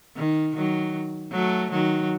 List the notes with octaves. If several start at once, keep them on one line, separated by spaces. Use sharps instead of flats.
D#3
D#3 F#3
F#3 A3
D#3 F#3